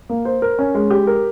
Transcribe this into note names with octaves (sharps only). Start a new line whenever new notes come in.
A#3
C5
A#4
C#4
G#3
G4
A#4